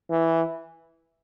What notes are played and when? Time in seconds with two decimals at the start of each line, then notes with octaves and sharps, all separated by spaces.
0.10 E3